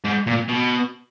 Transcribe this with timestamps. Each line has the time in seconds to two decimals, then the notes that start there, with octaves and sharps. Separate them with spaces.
0.05 G#2
0.27 A#2
0.48 B2